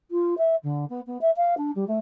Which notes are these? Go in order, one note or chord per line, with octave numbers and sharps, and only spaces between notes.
F4
E5
D3
B3
B3
E5
F5
D4
G3
A3